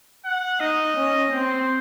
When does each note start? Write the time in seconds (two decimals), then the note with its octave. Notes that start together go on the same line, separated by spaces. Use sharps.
0.25 F#5
0.60 D#4 D#5
0.96 C#4
1.31 C4 C5